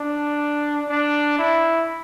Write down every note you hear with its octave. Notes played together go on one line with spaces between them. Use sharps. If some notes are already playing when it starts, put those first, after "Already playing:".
Already playing: D4
D4
E4